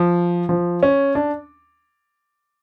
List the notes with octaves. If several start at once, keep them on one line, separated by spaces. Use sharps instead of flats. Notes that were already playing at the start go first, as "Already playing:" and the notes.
Already playing: F3
F3
C#4
D4